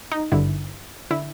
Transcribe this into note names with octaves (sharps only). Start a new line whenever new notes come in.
D#4
G#1 G2 D3 E4
D3 E4